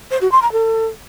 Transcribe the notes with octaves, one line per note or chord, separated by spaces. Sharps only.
C5
F#4
C6
A#5
A4